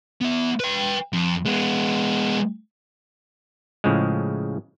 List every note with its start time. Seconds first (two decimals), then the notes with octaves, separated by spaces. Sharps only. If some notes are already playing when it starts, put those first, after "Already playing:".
0.21 B3 E5
0.60 B4 G5
1.13 F2
1.46 G#3 B3
3.84 A2 C#3 F3 G#3